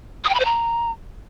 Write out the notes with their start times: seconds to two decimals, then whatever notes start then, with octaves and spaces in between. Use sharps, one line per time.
0.24 D#6
0.29 G5
0.34 B5
0.40 C5
0.45 A#5